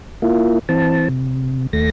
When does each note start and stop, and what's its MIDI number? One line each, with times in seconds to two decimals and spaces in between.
0.22 0.59 58
0.22 0.59 64
0.22 0.59 65
0.69 1.08 52
0.69 1.08 60
0.69 1.08 81
1.09 1.67 48
1.73 1.90 39
1.73 1.90 57
1.73 1.90 94